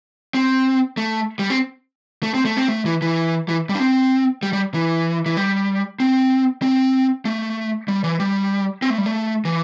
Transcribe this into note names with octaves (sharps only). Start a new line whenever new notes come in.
C4
A3
G3
C4
A3
C4
A3
C4
A3
E3
E3
E3
G3
D4
C4
G3
G3
E3
E3
G3
C4
C4
A3
G3
E3
G3
C4
A3
G3
A3
E3